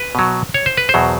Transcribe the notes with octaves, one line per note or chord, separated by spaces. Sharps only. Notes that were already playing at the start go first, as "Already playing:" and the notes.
Already playing: B4
B2 F#3
C#5
C5
B4
C5
E2 B2 F#3